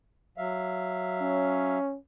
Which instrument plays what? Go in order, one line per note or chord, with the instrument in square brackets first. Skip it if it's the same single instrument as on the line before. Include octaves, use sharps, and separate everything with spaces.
[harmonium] F#3 E5 F5
[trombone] C#4